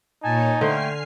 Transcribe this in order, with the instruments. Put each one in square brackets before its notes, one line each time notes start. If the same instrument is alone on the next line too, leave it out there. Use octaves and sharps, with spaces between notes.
[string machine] A#2 C#5 [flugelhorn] D#4 [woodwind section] G#5 A5
[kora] D3 C5 [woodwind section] A3 G5 [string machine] G#5 F6 C7